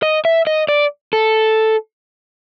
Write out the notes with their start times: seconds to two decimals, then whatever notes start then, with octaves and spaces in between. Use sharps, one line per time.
0.03 D#5
0.25 E5
0.47 D#5
0.68 D5
1.13 A4